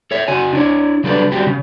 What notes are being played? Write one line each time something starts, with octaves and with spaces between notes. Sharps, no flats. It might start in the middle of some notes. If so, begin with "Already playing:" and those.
A4 C#5 E5
C#3 F#4 G#5
D4 E4 C#5
C#3 F#3 G3 D4 A4 B4
G3 C4 F#4 G4
C#3